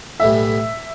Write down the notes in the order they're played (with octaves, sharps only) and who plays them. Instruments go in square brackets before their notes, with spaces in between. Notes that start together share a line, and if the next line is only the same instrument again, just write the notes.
[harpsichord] B1 A2 E3 G3 [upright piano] E5